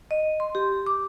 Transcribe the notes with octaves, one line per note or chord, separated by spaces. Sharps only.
D#5
C6
G4
D6